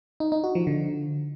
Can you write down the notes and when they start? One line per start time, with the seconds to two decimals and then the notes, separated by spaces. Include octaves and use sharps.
0.20 D#4
0.32 D#4
0.44 F#4
0.55 F3
0.67 D3